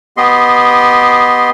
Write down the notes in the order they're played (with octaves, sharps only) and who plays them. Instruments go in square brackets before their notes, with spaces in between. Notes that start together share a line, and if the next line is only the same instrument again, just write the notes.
[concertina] B3 G4 D#5 C6